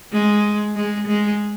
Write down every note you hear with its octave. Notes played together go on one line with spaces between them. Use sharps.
G#3
G#3
G#3